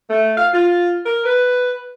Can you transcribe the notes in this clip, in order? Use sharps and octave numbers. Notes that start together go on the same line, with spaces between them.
A3
F5
F4
A#4
B4